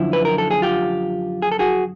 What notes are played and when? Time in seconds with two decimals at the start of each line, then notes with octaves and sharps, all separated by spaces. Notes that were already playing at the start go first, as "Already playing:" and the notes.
Already playing: F#2 D3 F3 E4
0.13 B4
0.25 A#4
0.38 A4
0.51 G#4
0.62 F4 G4
1.42 G#4
1.51 A4
1.59 F#4 G#4